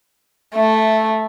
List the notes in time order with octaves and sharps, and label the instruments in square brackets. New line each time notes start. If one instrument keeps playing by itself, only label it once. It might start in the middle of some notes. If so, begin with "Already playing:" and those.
[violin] A3 [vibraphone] E5